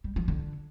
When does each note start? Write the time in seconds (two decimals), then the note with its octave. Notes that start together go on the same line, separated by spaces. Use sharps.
0.04 G3
0.16 F3
0.28 D3